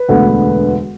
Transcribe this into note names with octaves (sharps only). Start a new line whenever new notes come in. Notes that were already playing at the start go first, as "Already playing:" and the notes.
Already playing: B4
E1 D2 D3 B3